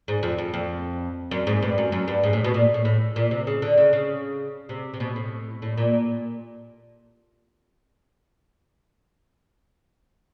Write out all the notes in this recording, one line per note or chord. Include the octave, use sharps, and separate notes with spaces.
G#2
F2
F2
F2
F#2
G#2
G2
F#2
F#2
G2
G#2
A2
B2
A#2
A2
A2
A#2
C3
C#3
D3
C#3
C#3
C3
C3
B2
A2
A2
A#2